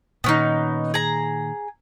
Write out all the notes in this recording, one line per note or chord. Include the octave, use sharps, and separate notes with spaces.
A#2 D#3 B3 C#4 D#4
G#4 A#5